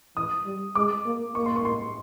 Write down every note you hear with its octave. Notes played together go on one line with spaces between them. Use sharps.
E3 D#6
G3
G#3 D6
A#3
A#3 C#6
C6
C#6
C6